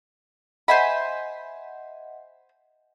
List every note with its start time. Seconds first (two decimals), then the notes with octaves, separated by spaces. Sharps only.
0.68 C5 D#5 E5 F#5 G#5 B5